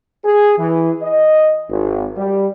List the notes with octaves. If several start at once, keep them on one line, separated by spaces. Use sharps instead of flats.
G#4
E3
D#5
G#1
G3